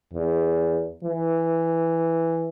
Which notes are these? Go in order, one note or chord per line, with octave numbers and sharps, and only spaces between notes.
E2
E3